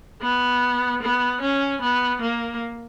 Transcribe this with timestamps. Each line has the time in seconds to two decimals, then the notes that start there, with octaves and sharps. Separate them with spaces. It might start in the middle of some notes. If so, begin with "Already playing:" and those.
0.22 B3
1.02 B3
1.41 C#4
1.82 B3
2.21 A#3